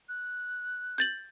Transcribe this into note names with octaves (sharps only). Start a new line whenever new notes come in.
F#6
G6 A6 F#7